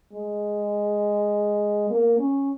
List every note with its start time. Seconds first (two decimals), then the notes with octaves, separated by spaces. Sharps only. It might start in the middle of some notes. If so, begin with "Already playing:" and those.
0.13 G#3
1.90 A#3
2.19 C#4